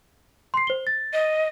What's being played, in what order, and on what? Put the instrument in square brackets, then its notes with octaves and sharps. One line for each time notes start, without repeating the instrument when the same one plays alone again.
[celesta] C6 C7
C5 G7
A6
[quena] D#5